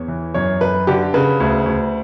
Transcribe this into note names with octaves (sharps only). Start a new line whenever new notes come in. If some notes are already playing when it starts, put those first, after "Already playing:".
Already playing: E2 C#5
E3
F#2 C#5
F#2 B4
D3 G4
C#3 B4
D2
D2